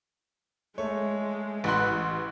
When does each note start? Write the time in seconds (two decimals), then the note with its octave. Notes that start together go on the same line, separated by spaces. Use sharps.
0.78 G#3 A3 C#5
1.64 A1 B4 F#5 C6 F#6